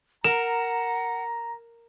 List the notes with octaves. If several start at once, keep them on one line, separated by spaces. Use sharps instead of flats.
A#4 F#5 A#5 E7